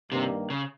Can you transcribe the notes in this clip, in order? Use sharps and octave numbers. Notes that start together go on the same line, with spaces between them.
G2 C3 D#3 G3 A#3
C#3